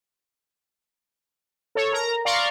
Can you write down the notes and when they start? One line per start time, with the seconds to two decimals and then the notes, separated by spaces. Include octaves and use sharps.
1.75 A4 C#5
1.92 A#4 A#5
2.25 D5 F5 A#5 C6 C#6